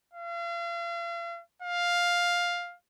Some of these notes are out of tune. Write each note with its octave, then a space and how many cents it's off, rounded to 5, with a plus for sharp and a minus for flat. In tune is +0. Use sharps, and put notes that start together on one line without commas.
F5 -40
F5 +5